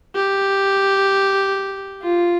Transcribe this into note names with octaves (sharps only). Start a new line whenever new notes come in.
G4
F4